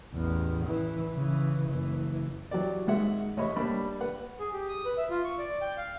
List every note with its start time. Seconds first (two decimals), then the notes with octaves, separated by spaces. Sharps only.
0.14 A1 E2
0.66 E3
1.14 C#3 E3
1.69 F#1 E3
2.51 E3 F#3 F#4 G4 D5
2.87 G#1 G#2 G#3 E5 F#5
3.37 A1 C#5 D#5 E5 B5
3.56 G3 A#3 D4 D5 B5
4.01 B4 F#5
4.39 G#4
4.53 G4
4.69 D#6
4.85 B4
4.97 E5
5.10 F4
5.24 C#6
5.39 D5
5.61 G5
5.77 F5